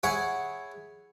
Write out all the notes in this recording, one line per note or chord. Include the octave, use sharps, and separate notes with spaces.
E4 G#4 C#5 F#5